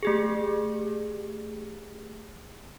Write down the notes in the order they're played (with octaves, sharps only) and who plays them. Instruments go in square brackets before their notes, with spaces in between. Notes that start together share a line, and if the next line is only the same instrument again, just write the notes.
[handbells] A3 G4 G#4